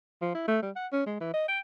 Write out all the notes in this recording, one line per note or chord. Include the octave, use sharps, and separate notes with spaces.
F3
E4
A3
G3
F#5
C#4
G#3
E3
D#5
G5